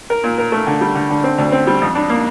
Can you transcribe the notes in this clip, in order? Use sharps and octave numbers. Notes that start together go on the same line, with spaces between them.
A#4
A#2
A#4
A3
D3
G3
D3
D3
C4
D2
C4
G3
F2
D4
A#3